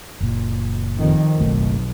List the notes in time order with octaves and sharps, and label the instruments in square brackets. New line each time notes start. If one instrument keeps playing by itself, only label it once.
[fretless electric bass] F#1 A#2
[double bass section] F2 D#3
[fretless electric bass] F#1 A3 [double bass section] B1